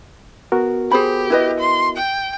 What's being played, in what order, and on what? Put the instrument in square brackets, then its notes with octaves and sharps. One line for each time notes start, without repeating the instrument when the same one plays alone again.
[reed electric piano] B3 F#4 A#4
[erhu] G4 [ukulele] G#4 C5 B5
[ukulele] E4 B4 D#5
[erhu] C6
G5